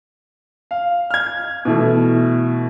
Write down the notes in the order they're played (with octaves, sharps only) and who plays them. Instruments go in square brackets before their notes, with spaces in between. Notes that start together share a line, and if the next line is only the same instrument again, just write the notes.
[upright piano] F5
F6 G#6
B2 E3 A3